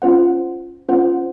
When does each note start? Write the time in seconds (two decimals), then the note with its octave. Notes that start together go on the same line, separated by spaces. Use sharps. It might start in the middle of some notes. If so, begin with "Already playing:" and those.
0.02 C#4 F4 C5 F#5
0.89 C#4 F4 C5 F#5